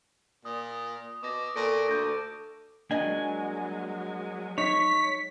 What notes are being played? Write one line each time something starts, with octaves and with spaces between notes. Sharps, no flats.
A#2 D#6
B2 D6 A#6
A#2 A4 C#6 A#6 D7
D2 C#6 G6 A#6
F#3 G#3 A#3 D4 D#5 G#5
D#4 C#5 B6